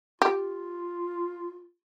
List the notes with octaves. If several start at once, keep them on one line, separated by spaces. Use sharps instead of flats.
F4 G4